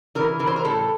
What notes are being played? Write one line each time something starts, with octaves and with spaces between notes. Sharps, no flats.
E3 A#4
E3 A#4
C5
A#4
A2 A4